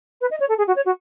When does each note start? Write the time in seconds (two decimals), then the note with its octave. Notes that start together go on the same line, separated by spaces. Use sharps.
0.21 B4
0.31 D#5
0.40 C#5
0.49 A4
0.58 G#4
0.67 F#4
0.76 C#5
0.85 F#4